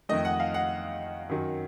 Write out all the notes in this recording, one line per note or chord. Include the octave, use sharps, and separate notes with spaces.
F2 D#3 A3 D#5
F#5
F5
F#5
F#2 D#3 F#3